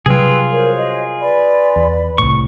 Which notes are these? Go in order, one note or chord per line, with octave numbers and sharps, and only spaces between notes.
C3 F#3 G3 F4 G#4 B4 G5 E6
F#4 A#4 C5 C#5
D#5
B4 D5 B5
E2
C2 A2 C#6